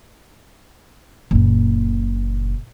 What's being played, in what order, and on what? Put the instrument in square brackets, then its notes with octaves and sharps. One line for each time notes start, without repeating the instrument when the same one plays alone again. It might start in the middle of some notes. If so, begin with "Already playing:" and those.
[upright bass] F#1 A#2